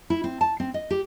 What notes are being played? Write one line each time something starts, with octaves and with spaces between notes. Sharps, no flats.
E4
C4
A5
C4
D#5
G4